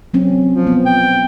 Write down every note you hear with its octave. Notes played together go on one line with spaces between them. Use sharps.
F#3 C4 C#4
F3
B3
G5